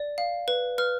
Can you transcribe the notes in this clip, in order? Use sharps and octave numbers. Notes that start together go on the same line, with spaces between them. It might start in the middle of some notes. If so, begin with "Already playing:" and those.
Already playing: D5
F5
B4
B4 F6